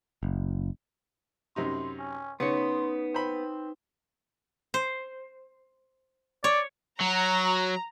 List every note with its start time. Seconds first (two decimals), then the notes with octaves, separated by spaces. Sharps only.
0.23 F#1
1.56 F#2 C3 D#4 C6
1.99 C#4
2.40 C#3 B3 D#4 B4 C#5 C6
3.14 C4 C5 B5
4.74 C5
6.44 C#5 D5
7.01 F#3 A#5